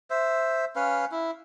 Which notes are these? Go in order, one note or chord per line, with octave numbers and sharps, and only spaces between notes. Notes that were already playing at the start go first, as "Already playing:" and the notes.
C5 E5
C#4 B4 F5
E4